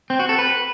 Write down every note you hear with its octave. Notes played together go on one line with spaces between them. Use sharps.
C4
F#4
A4
B4